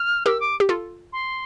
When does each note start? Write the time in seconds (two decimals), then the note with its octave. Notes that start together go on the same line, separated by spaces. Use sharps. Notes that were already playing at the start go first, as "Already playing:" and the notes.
Already playing: F6
0.25 G4 A#4 E6
0.40 D6
0.60 G4
0.69 F4 A4
1.12 C6